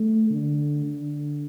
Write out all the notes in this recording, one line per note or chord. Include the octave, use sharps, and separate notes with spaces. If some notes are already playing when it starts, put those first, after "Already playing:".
Already playing: A3
D3
D3